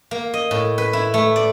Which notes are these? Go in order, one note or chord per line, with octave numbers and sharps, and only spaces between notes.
A#3
D#5
A2
B4
E4
A3
D5